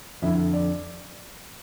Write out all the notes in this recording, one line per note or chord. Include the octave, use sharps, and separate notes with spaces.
F2 D3 E4
D5